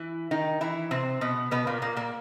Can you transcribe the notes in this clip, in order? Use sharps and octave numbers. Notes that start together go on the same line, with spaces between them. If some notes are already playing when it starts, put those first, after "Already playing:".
Already playing: E3 E4
D#3 D#4
E3 E4
C3 C4
B2 B3
B2 B3
A#2 A#3
A#2 A#3
A#2 A#3